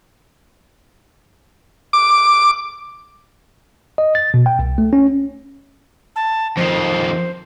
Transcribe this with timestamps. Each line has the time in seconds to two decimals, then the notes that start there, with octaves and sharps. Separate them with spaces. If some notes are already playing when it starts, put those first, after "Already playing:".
1.93 D6
3.98 D#5
4.15 A6
4.34 B2
4.46 G5
4.59 C2
4.78 A3
4.93 C#4
6.16 A5
6.57 F2 D#3 C5